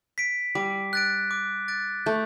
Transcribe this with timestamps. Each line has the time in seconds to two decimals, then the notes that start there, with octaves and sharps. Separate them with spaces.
0.18 B6 D7
0.55 G3 D6
0.93 F#6 A6 D7
1.31 D6
1.68 F#6 A6 D7
2.06 A3 G6